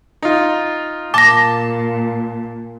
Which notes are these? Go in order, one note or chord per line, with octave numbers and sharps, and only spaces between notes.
D#4 F4
A#2 A5 D6 A#6